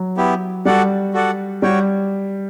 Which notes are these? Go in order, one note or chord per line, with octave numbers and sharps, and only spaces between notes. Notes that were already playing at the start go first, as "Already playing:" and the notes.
Already playing: F#3
B3 E4 G4
G3 F#4 A4 D5 F#5
F#4 A4 D5 F#5
G3 F#4 C#5 G5